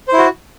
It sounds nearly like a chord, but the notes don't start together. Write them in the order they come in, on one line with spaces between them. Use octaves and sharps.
C5 E4 F#4